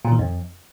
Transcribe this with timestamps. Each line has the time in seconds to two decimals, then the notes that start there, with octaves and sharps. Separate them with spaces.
0.05 A#2
0.12 D#3
0.19 F2